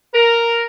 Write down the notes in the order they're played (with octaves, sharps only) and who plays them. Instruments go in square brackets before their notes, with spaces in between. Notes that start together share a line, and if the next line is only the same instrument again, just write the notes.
[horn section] A#4